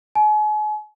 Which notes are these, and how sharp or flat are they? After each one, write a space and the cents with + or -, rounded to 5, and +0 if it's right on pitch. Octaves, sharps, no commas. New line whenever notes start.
G#5 +40